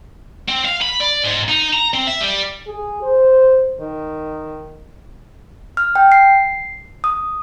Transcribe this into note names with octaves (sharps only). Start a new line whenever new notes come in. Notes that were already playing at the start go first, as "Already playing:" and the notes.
C4
F5
B5
D5
G#2
D#4
A#5
C4
E5
G3
G#4
C5
D#3
F6
G5
C7
D#6